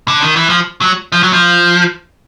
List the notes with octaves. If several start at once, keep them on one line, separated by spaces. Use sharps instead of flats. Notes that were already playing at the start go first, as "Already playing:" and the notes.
D3
D#3
E3
F3
F#3
F3
F#3
F3